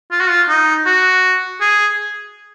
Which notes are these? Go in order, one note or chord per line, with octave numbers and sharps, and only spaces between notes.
F4
F#4
F4
D#4
F#4
G#4